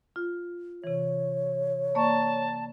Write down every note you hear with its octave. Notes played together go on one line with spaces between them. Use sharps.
F4
C3 E3 C#5
A#3 D5 A5 C#6